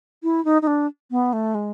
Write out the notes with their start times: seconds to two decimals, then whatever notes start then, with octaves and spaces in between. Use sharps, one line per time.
0.23 E4
0.45 D#4
0.62 D#4
0.67 D4
1.11 B3
1.33 A3
1.55 G#3